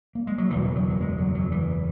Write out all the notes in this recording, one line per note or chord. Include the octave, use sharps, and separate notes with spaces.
A#3
G#3
F#3
F#1 E2 B2 E3
F#3
F#3
G#3
F#3
F#3
E3